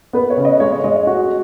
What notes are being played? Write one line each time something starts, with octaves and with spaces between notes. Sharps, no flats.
B3 B4
C#5
C#3
D#5
G#3 C#5
C#5
G#3 D#5
D#5
F#4